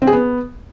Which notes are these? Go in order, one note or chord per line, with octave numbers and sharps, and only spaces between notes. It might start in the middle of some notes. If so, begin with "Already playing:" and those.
C4
G#4
B3